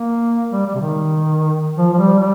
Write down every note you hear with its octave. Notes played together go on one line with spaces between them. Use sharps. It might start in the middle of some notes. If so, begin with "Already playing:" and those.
Already playing: A#3
G3
G3
C3
D#3
F3
F3
G3
G3